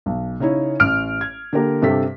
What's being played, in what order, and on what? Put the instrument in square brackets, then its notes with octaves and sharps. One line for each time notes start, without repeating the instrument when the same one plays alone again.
[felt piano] B1
C#3 C#4 D#4 E4 C#5
A1 F6 D7
G#6
D3 A#3 G4 A#4
G2 C3 G4 A4 B6